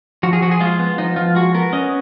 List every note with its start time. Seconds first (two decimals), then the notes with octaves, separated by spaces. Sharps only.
0.23 F3 F#4
0.33 G#4
0.42 F3 F#4
0.51 G#4
0.60 G#3 F4
0.79 B3
0.98 F3 D#4
1.16 F3 F4
1.35 G#3 F#4
1.54 B3 A#4
1.73 C#4 D#5